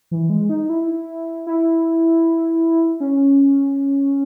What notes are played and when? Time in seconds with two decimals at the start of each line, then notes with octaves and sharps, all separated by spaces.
0.11 E3
0.30 G#3
0.49 D#4
0.70 E4
1.47 E4
3.00 C#4